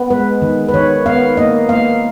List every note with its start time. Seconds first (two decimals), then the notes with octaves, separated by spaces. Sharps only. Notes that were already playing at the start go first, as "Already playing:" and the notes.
Already playing: B3
0.10 G#3 B4
0.42 D#3
0.69 B4
0.74 D#3 C#5
1.06 B3 F5
1.37 A#3 D#5
1.69 A#3 F5